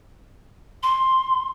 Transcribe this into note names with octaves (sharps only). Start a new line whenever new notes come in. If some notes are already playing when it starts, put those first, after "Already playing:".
C6